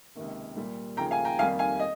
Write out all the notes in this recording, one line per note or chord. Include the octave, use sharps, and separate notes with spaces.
C#2 C3 D#3 A#3
A#2 G3 A#3
D#2 C#3 F3 A#3 G5 A#5
F5 G#5
G5 A#5
F2 D#3 G3 A#3 F5 G#5
F5 G#5
D#5